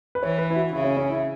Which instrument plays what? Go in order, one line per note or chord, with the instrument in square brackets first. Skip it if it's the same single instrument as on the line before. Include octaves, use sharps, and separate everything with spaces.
[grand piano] B4
[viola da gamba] E3 [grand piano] C#5
[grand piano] B4
E4
F#4
[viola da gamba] C#3 [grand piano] E4
[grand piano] C#4
C#4
E4